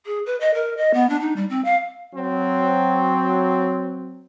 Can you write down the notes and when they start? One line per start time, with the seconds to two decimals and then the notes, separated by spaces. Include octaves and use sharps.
0.06 G#4
0.26 B4
0.40 D#5
0.54 A#4
0.77 D#5
0.94 B3
1.09 D4
1.21 D#4
1.36 G3
1.50 C4
1.65 F5
2.14 F#3 C4